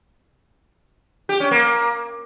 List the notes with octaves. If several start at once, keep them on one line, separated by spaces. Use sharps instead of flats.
G4
C#4
A#3